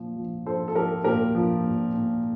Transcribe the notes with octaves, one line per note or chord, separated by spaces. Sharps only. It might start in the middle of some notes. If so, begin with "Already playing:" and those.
Already playing: A#2 F3
F3
F3 A4 C5
A4
F3 G4 A#4
A#2 G4 A#4
F3
A#2
A#2